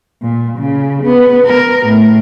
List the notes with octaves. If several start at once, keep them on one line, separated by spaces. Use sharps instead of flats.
A#2
C#3
B3
A#4
A2